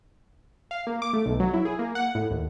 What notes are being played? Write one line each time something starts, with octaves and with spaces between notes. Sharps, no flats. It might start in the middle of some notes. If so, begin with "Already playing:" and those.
F5
A#3
D6
A3
B1
F#3
E4
G#4
A#3
F#5
A2
D#2